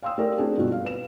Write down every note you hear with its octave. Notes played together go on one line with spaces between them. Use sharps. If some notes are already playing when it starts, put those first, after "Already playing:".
F5 G5 C6 D#6 E6
A3 G4 A#4 D5 G5
A3 C4 D4 E4 F#4 G#4
G2 B2 F4 F#4
F5
B4 E7